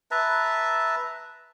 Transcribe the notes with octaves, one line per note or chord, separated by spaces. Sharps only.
B4 E5 A5 A#5